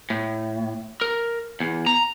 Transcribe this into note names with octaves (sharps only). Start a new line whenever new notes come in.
A2
A#4
E2
A#5